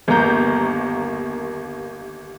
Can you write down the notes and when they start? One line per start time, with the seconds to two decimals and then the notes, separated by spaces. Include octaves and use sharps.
0.08 G1 D#2 A#3 A#5 G6